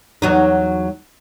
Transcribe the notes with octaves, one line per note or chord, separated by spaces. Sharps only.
E2 F#3 D#4